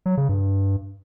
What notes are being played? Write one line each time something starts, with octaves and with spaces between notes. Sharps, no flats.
F#3
C#3
G2